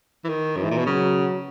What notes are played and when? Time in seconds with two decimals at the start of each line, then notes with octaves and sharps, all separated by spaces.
0.24 E3
0.29 D#3
0.56 F#2 E3
0.64 G#2
0.71 A#2
0.78 B2
0.86 C#3 F#3